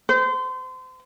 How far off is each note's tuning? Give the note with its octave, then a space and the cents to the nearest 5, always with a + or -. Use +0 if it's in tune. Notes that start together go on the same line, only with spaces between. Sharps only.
C5 -30